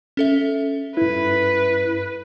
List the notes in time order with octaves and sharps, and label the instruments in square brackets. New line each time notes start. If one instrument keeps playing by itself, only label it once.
[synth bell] C#4 A4 E5
[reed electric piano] G2 E4 [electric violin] B4